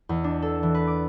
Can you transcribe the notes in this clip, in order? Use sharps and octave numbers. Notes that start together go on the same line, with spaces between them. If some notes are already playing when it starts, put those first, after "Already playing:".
E2
D4
A4
E3
B4
D6